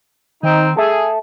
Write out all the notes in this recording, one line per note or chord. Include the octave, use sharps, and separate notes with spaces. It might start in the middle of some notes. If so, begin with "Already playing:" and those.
D#3 C4 D#4
G#4 A4 E5